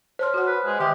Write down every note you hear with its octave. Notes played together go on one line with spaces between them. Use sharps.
C5 C#5 A5 C6 F6
F#4 F#5
B4
G#3
D#3 G4 E5